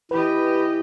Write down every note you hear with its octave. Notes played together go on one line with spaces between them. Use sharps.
E3 G4 B4 D#5 B5